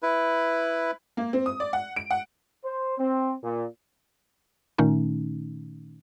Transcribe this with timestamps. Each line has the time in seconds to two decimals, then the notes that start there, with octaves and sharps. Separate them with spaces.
0.03 E4 B4
1.17 A#3
1.33 C4
1.46 D#6
1.60 D5
1.73 F#5
1.96 D7
2.11 F#5
2.65 C5
2.98 C4
3.44 A#2
4.78 A#2 D#3 A3 C#4 D#4